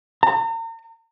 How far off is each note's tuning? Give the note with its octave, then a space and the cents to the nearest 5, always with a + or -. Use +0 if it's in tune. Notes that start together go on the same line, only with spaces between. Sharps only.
A#5 -40